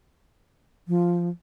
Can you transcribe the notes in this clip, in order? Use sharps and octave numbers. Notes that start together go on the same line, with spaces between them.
F3